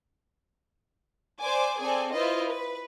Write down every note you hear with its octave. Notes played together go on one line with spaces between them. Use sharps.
C5 D5 G#5 D6
C4 G#4 A4 D5 G#5
E4 F4 B4 C5 D#5
B4